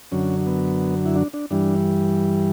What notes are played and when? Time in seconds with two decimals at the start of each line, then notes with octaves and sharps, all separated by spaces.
0.12 F#2 D3 F#3 C#4
0.46 B3
1.06 E4
1.16 D4
1.34 D4
1.51 G2 E3 G3 D4